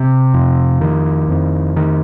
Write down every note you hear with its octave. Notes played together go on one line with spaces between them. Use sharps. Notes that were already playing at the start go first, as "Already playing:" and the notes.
Already playing: C3
F2
D#3
F2
D#3